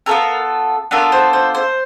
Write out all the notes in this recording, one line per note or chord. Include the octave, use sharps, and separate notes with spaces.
B3 D4 F4 A4 A#4
B3 D4 F4 A4 A#4
C5
C5
C5